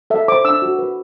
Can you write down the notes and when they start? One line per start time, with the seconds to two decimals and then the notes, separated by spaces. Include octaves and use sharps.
0.10 A4 E5
0.28 C5 D6
0.45 D4 E6
0.62 F#4
0.79 B4